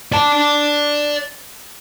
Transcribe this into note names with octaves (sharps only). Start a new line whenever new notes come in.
D5 A5